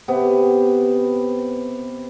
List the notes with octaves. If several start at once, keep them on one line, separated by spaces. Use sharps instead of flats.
C3 B3